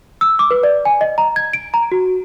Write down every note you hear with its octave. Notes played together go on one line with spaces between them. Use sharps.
E6
D6
B4
D5
G#5
D#5
A#5
G#6
D7
A#5
F#4